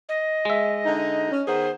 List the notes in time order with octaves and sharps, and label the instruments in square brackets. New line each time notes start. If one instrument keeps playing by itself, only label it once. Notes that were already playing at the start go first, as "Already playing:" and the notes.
[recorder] D#5
[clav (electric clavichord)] G#3 E5
[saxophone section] D3 D#4
C#4
[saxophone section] D#3 B3 G#4 [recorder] C5